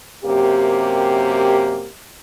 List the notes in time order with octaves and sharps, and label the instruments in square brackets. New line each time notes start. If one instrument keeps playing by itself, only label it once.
[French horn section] F#2 C3 A#3 G4